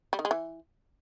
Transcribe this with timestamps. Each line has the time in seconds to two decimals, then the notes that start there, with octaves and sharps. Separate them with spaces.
0.13 G3
0.19 D#3
0.25 G#3
0.31 E3